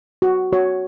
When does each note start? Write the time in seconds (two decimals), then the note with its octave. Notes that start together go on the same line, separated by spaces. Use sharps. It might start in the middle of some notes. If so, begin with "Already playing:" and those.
0.22 F#4
0.53 F#4 C#5